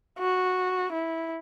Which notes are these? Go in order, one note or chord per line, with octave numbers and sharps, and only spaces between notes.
F#4
E4